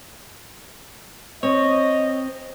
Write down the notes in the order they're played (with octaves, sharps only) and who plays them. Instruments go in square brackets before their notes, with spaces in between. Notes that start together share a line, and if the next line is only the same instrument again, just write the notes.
[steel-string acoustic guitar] C4 [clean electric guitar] C#5 [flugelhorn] D#5